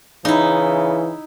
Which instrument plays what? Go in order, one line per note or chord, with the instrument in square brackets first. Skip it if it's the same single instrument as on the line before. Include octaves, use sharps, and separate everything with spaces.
[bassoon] C#3 [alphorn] E3 [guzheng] D#4 E4